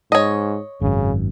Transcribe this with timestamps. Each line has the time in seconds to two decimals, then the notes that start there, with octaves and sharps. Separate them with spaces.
0.12 G#2 C#5 D#5
0.82 G#1 F#2 C#3